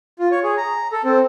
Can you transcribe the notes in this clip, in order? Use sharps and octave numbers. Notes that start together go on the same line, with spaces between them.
F4
C#5
G#4
A#5
A4
C4